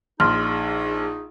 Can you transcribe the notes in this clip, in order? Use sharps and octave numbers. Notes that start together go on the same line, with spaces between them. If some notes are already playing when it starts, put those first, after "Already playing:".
A#1 D#4 G#4 C6 F6